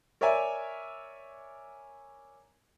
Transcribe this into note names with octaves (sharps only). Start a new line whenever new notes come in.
A#4 C#5 D5 E5 G#5